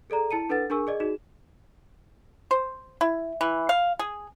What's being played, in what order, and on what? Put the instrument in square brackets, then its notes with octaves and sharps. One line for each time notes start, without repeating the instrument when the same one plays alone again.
[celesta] G#4 A4 D5 A#5
E4 A5 C#7 D#7
D4 A4 B4 F#5 A6
D4 G#4 A#4 G#5 C#6 E6
G#4 D5 D#5
D#4 F#4 G#4 E7
[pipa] C5
E4
E3
F5
G#4